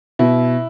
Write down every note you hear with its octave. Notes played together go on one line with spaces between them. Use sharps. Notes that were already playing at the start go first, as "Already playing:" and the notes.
B2 E4